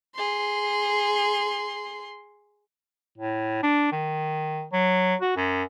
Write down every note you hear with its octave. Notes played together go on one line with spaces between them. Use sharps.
G#4 C6
A2
D4
D#3
F#3
F#4
F#2